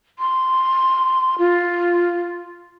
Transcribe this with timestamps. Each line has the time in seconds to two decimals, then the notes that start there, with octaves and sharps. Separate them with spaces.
0.19 C6
1.39 F4